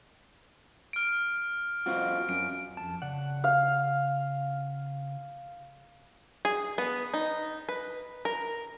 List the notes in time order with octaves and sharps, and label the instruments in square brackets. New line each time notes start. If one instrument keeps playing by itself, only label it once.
[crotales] F6 D7
[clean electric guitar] C4 F4 F#4
[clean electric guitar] F#2 [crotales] D7
[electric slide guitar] F2 A5
C#3 D5 F#5
[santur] F5
[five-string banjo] G#4
B3
D#4
B4
A#4